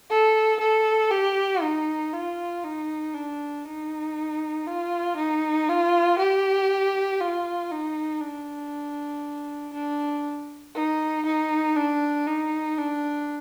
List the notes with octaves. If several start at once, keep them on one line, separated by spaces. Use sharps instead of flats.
A4
A4
G4
D#4
F4
D#4
D4
D#4
F4
D#4
F4
G4
F4
D#4
D4
D4
D#4
D#4
D4
D#4
D4